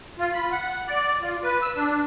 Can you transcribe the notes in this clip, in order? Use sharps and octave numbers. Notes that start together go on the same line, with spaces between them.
F4
B5
F#5
D5
F4
B4
E6
D4